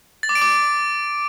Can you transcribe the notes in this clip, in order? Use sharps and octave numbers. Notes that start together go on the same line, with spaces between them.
A6
D6
D7
D6